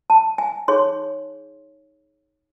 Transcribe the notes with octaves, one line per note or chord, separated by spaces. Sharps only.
A5
G#5
D#4 G#4 C#5 C6